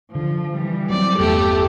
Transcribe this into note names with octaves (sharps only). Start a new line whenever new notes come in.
D3 F3
E3 G3
F#3 G#3 C4 D5
G1 E2 A3 B3 G4 A4